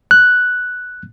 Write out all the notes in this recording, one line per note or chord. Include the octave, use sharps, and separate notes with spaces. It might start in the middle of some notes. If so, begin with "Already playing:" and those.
F#6